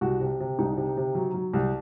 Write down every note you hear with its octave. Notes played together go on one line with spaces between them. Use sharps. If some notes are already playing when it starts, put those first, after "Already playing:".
C2 F#4
C3
C3
C2 D#4
C3
C3
F#3
F#3
C2